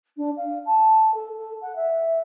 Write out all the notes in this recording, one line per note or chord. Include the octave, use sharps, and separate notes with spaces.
D4
F5
A5
A4
A4
F#5
E5